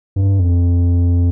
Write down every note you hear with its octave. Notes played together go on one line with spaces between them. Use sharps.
G2
F2